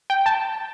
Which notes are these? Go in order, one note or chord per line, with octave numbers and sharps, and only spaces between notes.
G5
A5